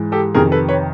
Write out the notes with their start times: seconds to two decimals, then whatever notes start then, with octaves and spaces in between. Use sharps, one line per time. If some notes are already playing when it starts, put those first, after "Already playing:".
Already playing: G#2 E3
0.12 G4 A4
0.35 F2 C3 D#3 G#4 A#4
0.52 A4 B4
0.69 B4 C#5